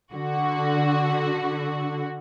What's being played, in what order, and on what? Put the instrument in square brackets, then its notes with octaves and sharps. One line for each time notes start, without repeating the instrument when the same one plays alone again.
[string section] D3 F#4